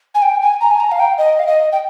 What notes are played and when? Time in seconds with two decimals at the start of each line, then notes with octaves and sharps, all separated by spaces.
0.15 G#5
0.22 G5
0.42 G#5
0.61 A#5
0.71 G#5
0.80 A#5
0.91 F5
0.99 G5
1.18 D#5
1.39 F5
1.47 D#5
1.72 G5